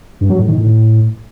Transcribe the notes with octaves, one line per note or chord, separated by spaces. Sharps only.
G2
F#3
A2
D#3
A2